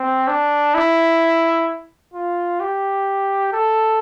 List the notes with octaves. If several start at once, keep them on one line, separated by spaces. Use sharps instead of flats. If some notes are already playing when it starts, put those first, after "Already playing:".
Already playing: C4
D4
E4
F4
G4
A4